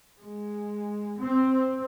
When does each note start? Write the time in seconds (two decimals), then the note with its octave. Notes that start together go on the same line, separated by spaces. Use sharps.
0.18 G#3
1.18 C4